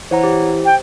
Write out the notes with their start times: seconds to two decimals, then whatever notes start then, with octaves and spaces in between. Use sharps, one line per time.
0.11 E3 C5 C#5 F#5 A#5
0.23 G4
0.65 G5